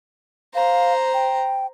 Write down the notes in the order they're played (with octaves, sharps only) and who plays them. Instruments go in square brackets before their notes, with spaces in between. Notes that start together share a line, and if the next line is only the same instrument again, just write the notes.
[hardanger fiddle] C5 A#5 [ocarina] F5
[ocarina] G5